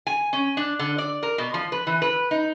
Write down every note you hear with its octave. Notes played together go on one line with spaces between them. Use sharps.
G#5
C#4
D4
D3
D5
A#4
B2
F3
B4
E3
B4
D#4